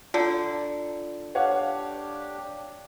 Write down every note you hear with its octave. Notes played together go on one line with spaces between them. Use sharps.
D3 F4
D4 G4 C#5 F5 F#5